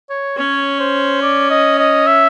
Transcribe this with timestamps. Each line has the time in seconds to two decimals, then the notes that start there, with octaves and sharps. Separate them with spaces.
0.10 C#5
0.37 C#4 C#5
0.80 C5
1.22 D5
1.50 D#5
1.78 D#5
2.06 E5